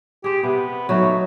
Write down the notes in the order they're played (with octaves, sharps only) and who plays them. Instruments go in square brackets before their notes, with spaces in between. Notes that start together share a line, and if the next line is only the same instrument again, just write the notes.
[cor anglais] G4 [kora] G#4 C5
[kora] C3 [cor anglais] B3
[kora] F#3 A3 D#4 [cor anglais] C#5